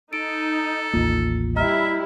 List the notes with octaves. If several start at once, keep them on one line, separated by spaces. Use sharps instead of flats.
D#4 A4 D7
A1 D#2 A#3 F4
G3 E4 D#5 E5 A#5 F6